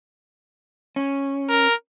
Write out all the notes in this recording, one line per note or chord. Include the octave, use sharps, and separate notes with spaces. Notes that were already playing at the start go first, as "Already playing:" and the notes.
C#4
A#4